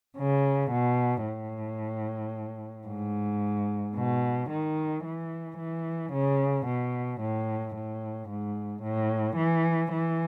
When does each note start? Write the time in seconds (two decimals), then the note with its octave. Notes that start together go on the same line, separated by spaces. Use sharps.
0.17 C#3
0.71 B2
1.25 A2
2.87 G#2
3.95 B2
4.50 D#3
5.04 E3
5.58 E3
6.13 C#3
6.66 B2
7.21 A2
7.75 A2
8.30 G#2
8.83 A2
9.37 E3
9.92 E3